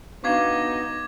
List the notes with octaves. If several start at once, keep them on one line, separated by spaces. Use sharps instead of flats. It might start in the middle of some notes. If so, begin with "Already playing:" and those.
B3 D4 D#4 F#4 F5 C#6 D6 G#6